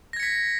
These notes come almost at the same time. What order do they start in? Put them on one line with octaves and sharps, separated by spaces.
A#6 G#6 C#7 B6